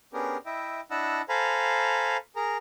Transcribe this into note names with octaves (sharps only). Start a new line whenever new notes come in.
B3 C#4 D4 G4 G#4 A#4
E4 D#5 E5 G5
D4 E4 D#5 F#5 A5 E6
A4 C5 F5 G#5 A#5 B5
G#4 A#4 A#5